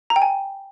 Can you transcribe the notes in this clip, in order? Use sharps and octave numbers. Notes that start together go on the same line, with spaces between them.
A#5
G5
G#5